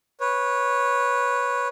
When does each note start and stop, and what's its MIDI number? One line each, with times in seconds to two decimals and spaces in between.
0.20 1.68 71
0.20 1.68 73